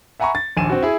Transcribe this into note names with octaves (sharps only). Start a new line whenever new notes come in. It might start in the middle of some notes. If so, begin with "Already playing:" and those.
E5 F#5 G#5 A#5 B5 C#6
A6
A#1 D#2 G#5 D#7 E7
C4 F#4
E4 G#4